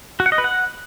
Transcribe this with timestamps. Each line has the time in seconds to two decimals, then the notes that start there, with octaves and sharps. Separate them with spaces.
0.20 F#4
0.26 F#5
0.32 D#5
0.38 B4
0.44 F#5